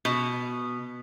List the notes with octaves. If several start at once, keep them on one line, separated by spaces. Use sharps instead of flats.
B2